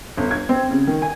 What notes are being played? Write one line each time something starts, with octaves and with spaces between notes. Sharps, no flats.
G1
G#6
C4
C#3
D#3
G#5